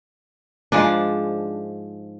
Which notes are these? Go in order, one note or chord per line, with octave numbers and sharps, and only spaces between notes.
G#2 F3 G#3 D4